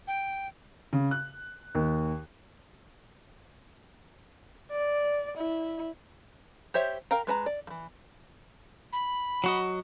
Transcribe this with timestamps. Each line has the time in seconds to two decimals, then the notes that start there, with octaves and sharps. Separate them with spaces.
0.07 G5
0.93 C#3
1.11 F#6
1.75 D#2
4.72 D5
5.37 E4
6.74 G4 C5 C#5 E5
7.11 A#4 F5 G5 A#5
7.27 G#3 B4 A5 A#5
7.46 D5
7.67 E3 F3
8.92 B5
9.44 F#3 F#4 D#5